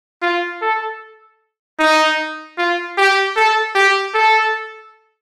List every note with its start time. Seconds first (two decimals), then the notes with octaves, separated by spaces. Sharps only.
0.22 F4
0.62 A4
1.79 D#4
2.57 F4
2.98 G4
3.36 A4
3.75 G4
4.14 A4